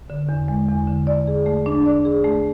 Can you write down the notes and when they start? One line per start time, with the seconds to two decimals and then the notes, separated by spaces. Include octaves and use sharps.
0.10 D3
0.29 E2
0.48 G#3
0.68 E2
0.87 D3
1.07 D5
1.27 G#4
1.46 A3
1.66 D4
1.86 D5
2.05 G#4
2.24 A3